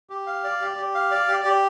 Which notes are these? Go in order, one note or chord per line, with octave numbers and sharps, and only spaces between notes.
G4
F5
D5
G4
G4
F5
D5
G4
G4